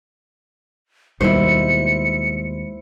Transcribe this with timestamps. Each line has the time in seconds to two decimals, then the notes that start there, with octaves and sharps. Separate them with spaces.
1.21 D#2 B2 G3 G#3 E4 C5 C#7